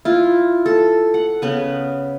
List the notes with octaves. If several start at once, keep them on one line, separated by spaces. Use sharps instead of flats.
E4 F4
A4
F#5
C#3 B3 B4